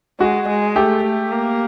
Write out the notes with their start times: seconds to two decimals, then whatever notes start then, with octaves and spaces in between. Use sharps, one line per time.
0.20 G#3 F#4
0.48 G#3
0.76 A3 G4
1.04 A3
1.32 A#3